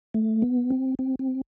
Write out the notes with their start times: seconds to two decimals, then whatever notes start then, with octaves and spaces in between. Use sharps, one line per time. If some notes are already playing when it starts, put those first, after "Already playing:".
0.14 A3
0.42 B3
0.70 C4
0.99 C4
1.19 C4